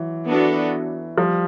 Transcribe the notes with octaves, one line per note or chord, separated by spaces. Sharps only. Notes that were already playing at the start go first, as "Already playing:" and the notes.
Already playing: E3 F#3
B3 D4 F#4 A4
F3 G3